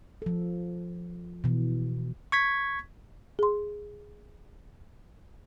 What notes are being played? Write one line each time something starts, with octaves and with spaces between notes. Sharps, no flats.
F3 A4
B2 E3
C#6 G#6 B6
G#4 C6